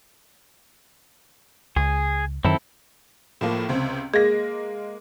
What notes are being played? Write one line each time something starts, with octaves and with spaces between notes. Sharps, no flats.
C#2 G#4
F#2 D#3 C4 E4 A4
A2 F3 A#3
C#2 C3 C4
G#3 A#3 G#4 A#6